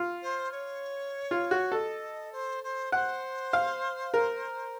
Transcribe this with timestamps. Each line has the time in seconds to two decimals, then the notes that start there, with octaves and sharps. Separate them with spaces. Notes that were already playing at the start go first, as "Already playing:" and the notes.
Already playing: F4
0.22 C5
0.51 C#5
1.31 F4
1.51 F#4
1.72 A4 D#5
2.32 C5
2.63 C5
2.92 C5 F#5
3.53 F5
4.14 A#4